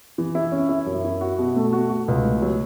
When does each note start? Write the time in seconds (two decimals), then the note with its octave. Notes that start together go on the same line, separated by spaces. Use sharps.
0.18 E3
0.35 E4
0.52 C#4
0.69 E4
0.86 F#2
1.04 E4
1.21 F#4
1.38 B2
1.56 A3
1.73 F#4
1.90 F#4
2.08 C#2
2.25 A2
2.42 F#3